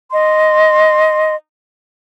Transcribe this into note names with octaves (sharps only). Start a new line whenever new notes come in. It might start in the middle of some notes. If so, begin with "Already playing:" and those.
D#5 C6